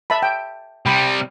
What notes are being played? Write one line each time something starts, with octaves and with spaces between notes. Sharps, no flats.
E5 A5 B5
G5
C3 G3 G5 B5